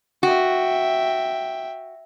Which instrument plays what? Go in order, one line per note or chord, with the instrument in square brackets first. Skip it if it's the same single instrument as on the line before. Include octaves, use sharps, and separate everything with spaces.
[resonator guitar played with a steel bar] F#4 [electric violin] E5 G5